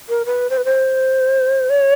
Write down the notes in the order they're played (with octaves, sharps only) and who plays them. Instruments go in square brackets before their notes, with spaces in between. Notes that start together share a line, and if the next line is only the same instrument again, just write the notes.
[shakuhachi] A#4
B4
C5
B4
C5
C#5